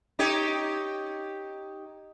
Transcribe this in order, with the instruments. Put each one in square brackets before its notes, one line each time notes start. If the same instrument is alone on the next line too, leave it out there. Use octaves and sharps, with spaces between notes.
[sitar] D#4 G4 C#5